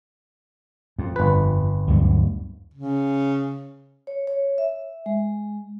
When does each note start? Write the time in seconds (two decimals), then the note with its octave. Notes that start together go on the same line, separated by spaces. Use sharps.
0.99 F2
1.16 G1 B4
1.88 D2 G2 F#3
2.74 C#3
4.07 C#5
4.27 C#5
4.58 E5
5.06 G#3